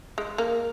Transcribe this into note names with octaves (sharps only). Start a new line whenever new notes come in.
G#3
A#3